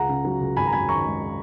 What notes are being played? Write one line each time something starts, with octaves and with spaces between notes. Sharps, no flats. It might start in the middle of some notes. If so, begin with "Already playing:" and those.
Already playing: C#2 F#5 A#5
C#3
F#3
C#2
G#1 G#5 B5
A#5
F#2 G#5 B5
D#3 A#5 C#6
G#3